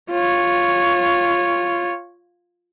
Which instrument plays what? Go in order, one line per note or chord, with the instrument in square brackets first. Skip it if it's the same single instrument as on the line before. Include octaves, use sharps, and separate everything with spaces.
[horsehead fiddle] F4 C#5